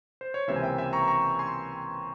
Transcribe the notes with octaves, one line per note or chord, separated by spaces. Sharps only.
C5
C#5
C#2 C3 E3 A#3 C#4 C5 E5
G#5
E5 G5
E5 G5
A#5 C#6
A#5 C#6
G#5 C6